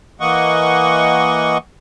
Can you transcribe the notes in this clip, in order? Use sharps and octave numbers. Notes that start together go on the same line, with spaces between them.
E3 A#3 D#5 F#5 C#6